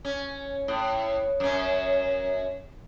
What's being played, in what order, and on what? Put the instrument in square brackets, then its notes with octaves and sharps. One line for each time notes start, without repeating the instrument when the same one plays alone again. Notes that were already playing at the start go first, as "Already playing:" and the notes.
[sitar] C#4
A2
F#2 C#4